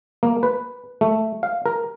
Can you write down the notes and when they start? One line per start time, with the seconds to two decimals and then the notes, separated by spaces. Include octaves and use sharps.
0.23 A#3
0.43 B4
1.01 A3
1.43 F5
1.66 A#4